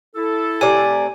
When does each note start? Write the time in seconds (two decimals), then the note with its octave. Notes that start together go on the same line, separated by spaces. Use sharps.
0.16 E4 A4
0.61 C3 A3 D5 G#5